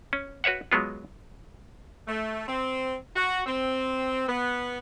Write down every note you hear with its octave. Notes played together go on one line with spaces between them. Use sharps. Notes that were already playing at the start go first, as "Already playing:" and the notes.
C#4
F#4 B4 C#5 E5 F#5
F#3 G#3 B3 F4
A3
C4
F#4
C4
B3